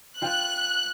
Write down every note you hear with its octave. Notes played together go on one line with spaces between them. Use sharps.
F4 G5 F#6